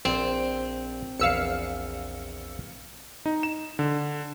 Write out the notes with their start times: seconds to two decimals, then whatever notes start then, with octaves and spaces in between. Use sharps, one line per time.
0.05 A#1 C4 D5
1.20 A#1 E2 B4 F5 E6 C#7
3.26 D#4
3.43 E7
3.79 D3